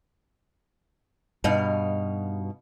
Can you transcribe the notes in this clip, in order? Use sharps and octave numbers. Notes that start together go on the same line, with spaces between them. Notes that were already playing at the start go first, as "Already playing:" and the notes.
G2 B2 D#4 F5